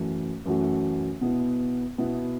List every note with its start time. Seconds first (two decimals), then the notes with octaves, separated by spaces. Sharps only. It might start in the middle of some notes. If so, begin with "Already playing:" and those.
Already playing: F#2 E3 A3 F#4
0.46 F#2 E3 A3 F#4
1.21 B2 B3 E4
1.98 B2 B3 E4